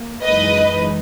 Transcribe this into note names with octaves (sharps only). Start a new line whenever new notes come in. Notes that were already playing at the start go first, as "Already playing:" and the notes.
Already playing: A#3
F#2 E3 G#3 D#4 B4 D#5